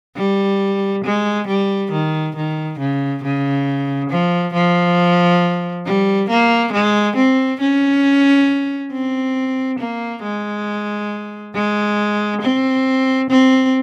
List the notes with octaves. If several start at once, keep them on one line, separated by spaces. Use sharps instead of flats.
G3
G#3
G3
D#3
D#3
C#3
C#3
F3
F3
G3
A#3
G#3
C4
C#4
C4
A#3
G#3
G#3
C4
C4